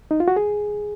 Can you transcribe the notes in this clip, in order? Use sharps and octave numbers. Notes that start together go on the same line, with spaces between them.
D#4
F4
F#4
G#4